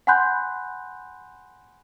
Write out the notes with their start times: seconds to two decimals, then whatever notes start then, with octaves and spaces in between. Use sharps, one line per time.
0.07 F#5 G#5 B5 C6 F#6 G6